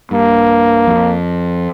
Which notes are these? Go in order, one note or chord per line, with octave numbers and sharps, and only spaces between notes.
G2 A#3
F2